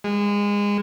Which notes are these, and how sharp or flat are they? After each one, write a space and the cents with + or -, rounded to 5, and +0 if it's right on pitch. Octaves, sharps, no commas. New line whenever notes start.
G#3 -25